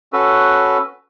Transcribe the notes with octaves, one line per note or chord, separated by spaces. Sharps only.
C#4 F#4 A4 B4